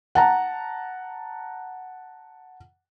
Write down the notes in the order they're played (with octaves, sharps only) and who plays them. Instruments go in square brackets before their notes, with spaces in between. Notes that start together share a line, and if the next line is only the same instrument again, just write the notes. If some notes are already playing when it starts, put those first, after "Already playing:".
[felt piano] F#5 A5 A#5